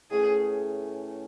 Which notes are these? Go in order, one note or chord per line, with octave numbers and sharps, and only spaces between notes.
A2 E3 A3 C#4 G#4